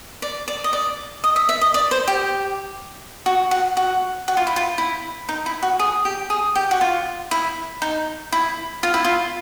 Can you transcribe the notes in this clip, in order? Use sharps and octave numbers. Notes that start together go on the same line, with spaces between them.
D5
D5
D#5
D5
D#5
E5
E5
D#5
D5
C5
G4
F#4
F#4
F#4
F#4
F4
E4
F4
E4
D#4
E4
F#4
G#4
G4
G#4
G4
F#4
F4
E4
D#4
E4
F4
E4
F4